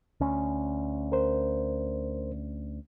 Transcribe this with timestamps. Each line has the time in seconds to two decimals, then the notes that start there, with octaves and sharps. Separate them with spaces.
0.20 D2 C#4
1.12 A#4 C5